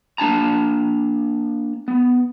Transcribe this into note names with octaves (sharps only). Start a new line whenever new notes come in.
A#3 D4 A5 A#5
B3